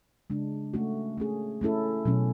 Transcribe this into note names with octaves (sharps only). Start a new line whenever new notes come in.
C#3 G#3 D4
A3 C#4 F#4
A3 C#4 G#4
A3 C#4 E4 A4
B2 F#3 C#4